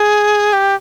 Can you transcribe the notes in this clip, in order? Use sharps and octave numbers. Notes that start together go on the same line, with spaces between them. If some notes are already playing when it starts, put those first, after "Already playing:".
Already playing: G#4
G4